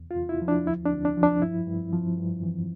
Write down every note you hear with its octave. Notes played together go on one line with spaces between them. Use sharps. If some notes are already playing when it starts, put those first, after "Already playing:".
Already playing: E2
F4
E2
E4
F3
D4
D2 E4
D4
D2
D4
F3
D4
G2 E4
G2
F3
G2
E3